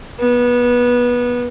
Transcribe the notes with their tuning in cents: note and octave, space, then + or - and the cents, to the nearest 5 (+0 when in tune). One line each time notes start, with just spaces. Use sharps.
B3 -20